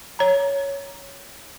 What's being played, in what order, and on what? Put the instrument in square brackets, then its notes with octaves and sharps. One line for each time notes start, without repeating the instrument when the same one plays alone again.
[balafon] C#5 A#5